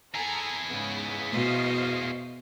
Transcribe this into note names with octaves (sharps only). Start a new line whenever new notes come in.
E4 G#4 A4 G#5 A#5
G#2 C#3 B3
B2 C5 D#5 F5